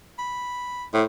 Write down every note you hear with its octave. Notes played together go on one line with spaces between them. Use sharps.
B5
A2 C5